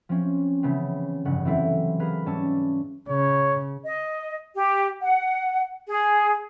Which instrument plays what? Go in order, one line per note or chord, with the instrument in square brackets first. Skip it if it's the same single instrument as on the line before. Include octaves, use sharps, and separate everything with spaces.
[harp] F3 C4 C#4
C#3 E3 B3 C4
F1 G2 C#3 F#5
E3 F#3 C4 E4 A4
G4 G#4 A#4 B4 F5 B5
G#2 G3 C#4 A5 C#6 E6
[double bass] C#3 [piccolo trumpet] C#5
[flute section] D#5
G4
F#5
G#4